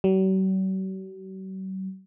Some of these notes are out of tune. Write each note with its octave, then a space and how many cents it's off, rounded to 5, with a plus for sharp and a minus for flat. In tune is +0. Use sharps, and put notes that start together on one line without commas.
F#3 +45